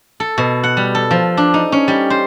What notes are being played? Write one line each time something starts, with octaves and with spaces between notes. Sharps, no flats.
A4
B2
F#5
G3
A4
F3
D4
D#4
C#4
G3
C5